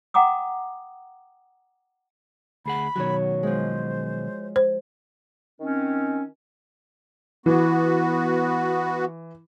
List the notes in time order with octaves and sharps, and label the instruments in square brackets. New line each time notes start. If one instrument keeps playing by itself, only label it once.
[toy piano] F#5 G5 A#5 D6 D#6
[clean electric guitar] D2 G#4 F#5 [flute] B5
[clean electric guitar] B2 D#3 F#3 [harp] F#4 C#5
[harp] F3 G#3 [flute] C5
[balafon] C5
[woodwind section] D#3 C4 C#4
[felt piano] E3 [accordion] B3 F#4